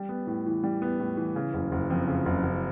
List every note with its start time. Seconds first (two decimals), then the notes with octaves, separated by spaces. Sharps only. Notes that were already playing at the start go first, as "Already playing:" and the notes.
Already playing: G3
0.09 B3
0.27 A2
0.46 E3
0.63 G3
0.82 B3
1.00 A2
1.17 E3
1.36 C#3
1.54 F#1
1.72 F#1
1.90 F2
2.07 C#3
2.26 F#1
2.43 F#1